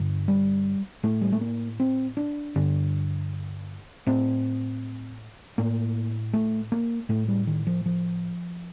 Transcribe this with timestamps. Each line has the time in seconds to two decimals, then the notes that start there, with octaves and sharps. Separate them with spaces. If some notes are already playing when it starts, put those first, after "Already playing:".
Already playing: G2 D3
0.28 G3
1.03 A2 A3
1.21 G3
1.32 A3
1.41 A#3
1.80 C4
2.17 D4
2.56 G2 D3
4.07 A2 C4
5.58 A2 A#3
6.33 A3
6.72 A#3
7.09 A2 A3
7.28 G3
7.47 D#3
7.67 F3
7.86 F3